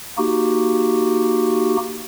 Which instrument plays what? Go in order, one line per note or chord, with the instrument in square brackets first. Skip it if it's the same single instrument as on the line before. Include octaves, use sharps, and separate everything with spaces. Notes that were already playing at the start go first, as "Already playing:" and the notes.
[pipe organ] A#3 D#4 F#4 G4